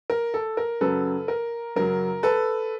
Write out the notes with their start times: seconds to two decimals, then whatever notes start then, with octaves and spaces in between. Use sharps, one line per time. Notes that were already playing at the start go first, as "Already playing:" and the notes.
0.10 A#4
0.34 A4
0.57 A#4
0.81 F#2 C#3 F#3 A4 B4
1.28 A#4
1.76 F#2 C#3 F#3 A#4
2.23 A4 B4